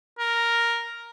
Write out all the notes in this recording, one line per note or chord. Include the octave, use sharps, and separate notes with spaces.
A#4